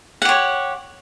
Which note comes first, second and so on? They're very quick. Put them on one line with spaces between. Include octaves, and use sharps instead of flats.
F#5 G4 C#5